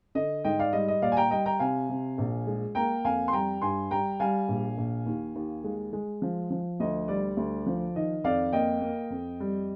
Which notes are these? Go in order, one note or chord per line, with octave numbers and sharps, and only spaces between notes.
D3 D#5
G#2 D#5 G5
D5 F5
G3 D#5
D#5
A#2 D5 F5
G#5
G5 A#5
G3 D#5 G5
G5 A#5
C3 F5 G#5
C3
A#1
G#3
A#3 G5 A#5
F2 F5 G#5
C6
G3 G5 A#5
G2 G#5 C6
G3 G5 A#5
G3 F5 G#5
A#1
A#1
D#2
D#2
G#3
G#3
F3
F3
D2 D#5
G3 D5
D2
F3
D#3 D#5
F2 D5 F5
A#3 D#5 G5
A#3
F2
G3